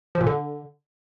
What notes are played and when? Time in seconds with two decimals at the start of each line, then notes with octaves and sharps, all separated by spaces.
0.15 F3
0.21 A#2
0.27 D3